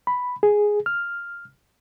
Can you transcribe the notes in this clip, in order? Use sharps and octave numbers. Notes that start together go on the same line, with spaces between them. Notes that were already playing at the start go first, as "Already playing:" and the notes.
B5
G#4
F6